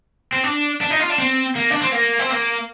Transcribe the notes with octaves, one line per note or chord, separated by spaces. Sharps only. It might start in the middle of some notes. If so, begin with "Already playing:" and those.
C4
D4
D4
D#4
F4
D4
C4
A#3
D4
C4
A#3
C4
A#3